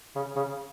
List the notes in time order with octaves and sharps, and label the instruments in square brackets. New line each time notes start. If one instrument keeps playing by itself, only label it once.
[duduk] C#3
C#3